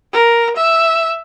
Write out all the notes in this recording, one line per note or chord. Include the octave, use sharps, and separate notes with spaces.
A#4
E5